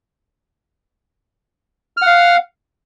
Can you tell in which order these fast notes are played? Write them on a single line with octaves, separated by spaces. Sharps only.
F6 F#5 F5